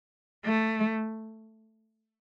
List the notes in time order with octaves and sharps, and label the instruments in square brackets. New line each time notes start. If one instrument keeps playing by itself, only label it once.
[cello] A3